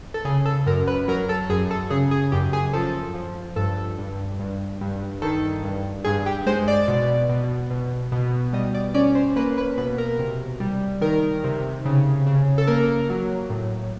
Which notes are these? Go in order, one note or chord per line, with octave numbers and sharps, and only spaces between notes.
A4
C#3 G#4
A4
F#2 A#4
B4
F#3 A#4
A4
F#2 G#4
A4
C#3 G#4
G#4
F#2 G4
G#4
F3 A4
F3
G2 A4
G2
G2
G2
D#3 A4
G2
G2 G#4
G4
G#3 C5
D5
B2
B2
B2
B2
G3 D#5
D5
C#4 D5
C5
A#3 B4
B4
B2 B4
A#4
C3
G3
D#3 A#4
C3
C#3
C#3
A4
A#3 A#4
F#3
A2